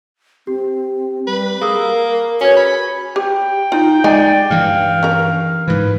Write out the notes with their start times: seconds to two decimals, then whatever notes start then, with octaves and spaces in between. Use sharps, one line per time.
0.47 C4 G4
1.27 G3 B4
1.61 A#3 G#4 A#4 D#6 E6
2.41 C#4 F#4 B4 C#5 G#6
2.57 B5
3.16 G4 G5
3.72 D#4 F4
4.04 G#3 D#4 D5 G#5
4.50 G2 E3 F5
5.03 C#4 A#4
5.68 G#2 E3 B4